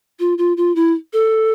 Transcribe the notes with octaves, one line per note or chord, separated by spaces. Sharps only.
F4
F4
F4
E4
A4